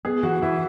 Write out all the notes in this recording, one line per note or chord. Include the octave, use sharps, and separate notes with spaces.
B3 G#4
E3 F#4
E3 E4